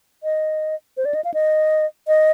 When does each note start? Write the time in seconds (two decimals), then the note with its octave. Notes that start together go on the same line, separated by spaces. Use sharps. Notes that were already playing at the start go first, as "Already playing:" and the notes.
0.23 D#5
0.97 C5
1.05 D5
1.15 D#5
1.24 F5
1.34 D#5
2.07 D#5